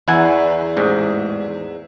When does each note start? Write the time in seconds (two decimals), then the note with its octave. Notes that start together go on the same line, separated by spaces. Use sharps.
0.08 E2 E4 F#5 G#5
0.77 A1 G#2